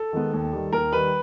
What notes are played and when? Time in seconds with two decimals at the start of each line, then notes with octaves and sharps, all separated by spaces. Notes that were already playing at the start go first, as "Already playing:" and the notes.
Already playing: A4
0.13 D#3 G#3 B3
0.33 D#2
0.53 D#3 G3
0.72 D#2 A#4
0.92 D#3 G3 B4